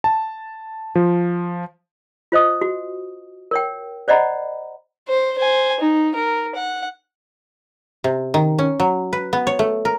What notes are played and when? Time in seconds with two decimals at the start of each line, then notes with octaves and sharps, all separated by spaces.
0.04 A5
0.95 F3
2.32 F4 C5 D#5 D#6
2.61 F#4
3.51 A#4 C#5 G5
4.08 C5 D5 D#5 F#5 A#5 B5
5.08 C5
5.38 C5 G#5
5.80 D#4
6.15 A#4
6.55 F#5
8.04 C3
8.34 D#3
8.59 C#4
8.80 F#3
9.13 B4
9.33 B3
9.47 C#5
9.59 A3
9.85 A#4